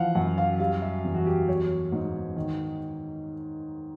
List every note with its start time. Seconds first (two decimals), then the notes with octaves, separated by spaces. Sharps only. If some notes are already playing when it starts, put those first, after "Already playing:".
Already playing: E3 F3 F5 F#5
0.15 F#2 F#5
0.38 F5
0.60 G3 F5
0.82 E5
1.05 E2
1.14 F#4
1.26 G4
1.48 F#3 C#5
1.92 G#2
2.36 D#3